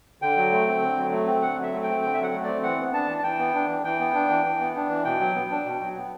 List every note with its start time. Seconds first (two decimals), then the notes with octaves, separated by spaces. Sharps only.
0.22 D3 G5
0.37 F#3
0.52 A3
0.67 C4
0.82 D3
0.97 F#3
1.12 A3
1.27 C4
1.42 D3 F#5
1.58 F#3 E5
1.73 A3
1.83 C4 G5
2.02 D3 G5
2.14 E5
2.18 F#3 F#5
2.34 A3
2.44 C4 D5
2.63 E3 F#5
2.79 B3
2.93 D4 A5
3.08 E3
3.18 A5
3.23 E3 G5
3.39 B3
3.54 D4
3.69 E3
3.84 E3 G5
4.00 B3
4.14 D4
4.29 E3
4.45 E3
4.60 B3
4.75 D4
4.89 E3
5.05 B2 G5
5.20 F#3
5.35 B3
5.51 D4
5.66 B2
5.81 F#3
5.96 B3